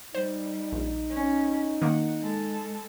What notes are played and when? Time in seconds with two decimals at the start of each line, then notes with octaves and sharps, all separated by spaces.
0.14 G3 D#4 C5
0.72 A#1
1.10 C#4
1.82 D#3 A#3 F#5
2.20 G#3 A4